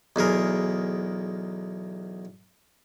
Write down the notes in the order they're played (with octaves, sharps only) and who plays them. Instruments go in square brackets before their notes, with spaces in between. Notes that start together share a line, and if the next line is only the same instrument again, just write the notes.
[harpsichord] B1 E2 G#4 A#4